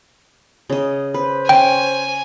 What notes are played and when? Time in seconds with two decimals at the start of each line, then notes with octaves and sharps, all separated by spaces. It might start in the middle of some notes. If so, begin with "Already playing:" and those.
0.70 C#3 D#5
1.14 B4 C5
1.49 C#4 G5 G#5